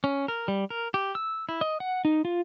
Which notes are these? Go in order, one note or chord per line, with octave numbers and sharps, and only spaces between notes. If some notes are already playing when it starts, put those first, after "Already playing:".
C#4
A#4
G3
A#4
G4
E6
E4
D#5
F#5
D#4
F4